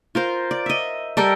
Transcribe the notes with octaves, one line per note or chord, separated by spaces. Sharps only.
F4 A#4 C5
D5
D#5 E5
G3 A4 A#4 G5